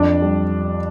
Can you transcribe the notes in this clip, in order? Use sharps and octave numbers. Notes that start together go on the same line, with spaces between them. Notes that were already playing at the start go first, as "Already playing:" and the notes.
Already playing: F2 D4
G3